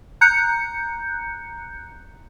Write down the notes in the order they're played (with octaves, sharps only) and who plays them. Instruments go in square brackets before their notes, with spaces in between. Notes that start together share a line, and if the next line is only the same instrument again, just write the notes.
[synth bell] A#5 F#6 G6 C#7